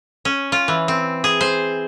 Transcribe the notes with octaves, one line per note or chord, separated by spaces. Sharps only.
C#4
F4
E3
C4
G#4
C5